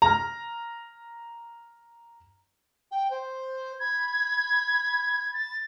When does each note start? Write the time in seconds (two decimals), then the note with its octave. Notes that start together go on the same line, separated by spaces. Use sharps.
0.02 A#5 F6
2.91 G5
3.10 C5
3.80 B5 G#6
5.33 A6